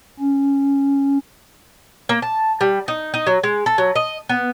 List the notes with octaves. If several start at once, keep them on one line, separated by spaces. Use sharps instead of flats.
C#4
A#3
A5
G3
D#4
D#4
F#3
G#3
A4
F#3
D#5
B3